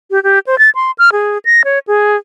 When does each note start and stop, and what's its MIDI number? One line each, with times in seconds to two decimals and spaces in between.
0.11 0.22 67
0.23 0.39 67
0.47 0.58 72
0.59 0.70 93
0.75 0.91 84
0.99 1.10 89
1.12 1.38 68
1.45 1.62 94
1.65 1.79 73
1.87 2.17 68